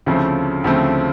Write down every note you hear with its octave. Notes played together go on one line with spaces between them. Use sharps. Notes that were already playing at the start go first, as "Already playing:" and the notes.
D2 C#3 F3 A3 C4
D2 C#3 F3 A3 C4